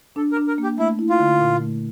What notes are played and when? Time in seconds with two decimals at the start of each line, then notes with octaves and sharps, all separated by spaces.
0.16 D4 A4
0.32 A#4
0.37 D4
0.47 A#4
0.58 A#3 G4
0.78 A3 E4
0.99 E4
1.10 F4
1.19 D3
1.40 A#2
1.62 A3